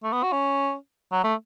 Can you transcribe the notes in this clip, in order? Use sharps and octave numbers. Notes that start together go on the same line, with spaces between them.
A3
B3
F#4
C#4
F#3
A3